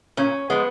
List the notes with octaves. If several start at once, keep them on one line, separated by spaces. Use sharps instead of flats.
A#2 C#4
F3 G#3 B3